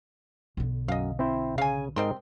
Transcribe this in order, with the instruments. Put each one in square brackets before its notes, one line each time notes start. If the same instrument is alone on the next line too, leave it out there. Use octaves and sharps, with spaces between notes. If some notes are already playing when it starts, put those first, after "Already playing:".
[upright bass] B1 D3
[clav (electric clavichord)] F#2 [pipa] D#5 F5
[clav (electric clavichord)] C4 E4 C5
[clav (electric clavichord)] C#3 [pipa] F5 G#5
[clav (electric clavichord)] G#2 A#4 D#5 [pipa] G3 C4 C6